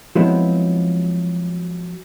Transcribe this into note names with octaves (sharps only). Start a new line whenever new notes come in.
F3 F#3 G#3 B3 C4 E4